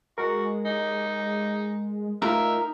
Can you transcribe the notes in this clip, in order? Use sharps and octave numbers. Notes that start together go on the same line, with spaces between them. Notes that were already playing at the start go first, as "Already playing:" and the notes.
G#3 F#4 A#4
D#4
A3 D#4 F4 A#4 E5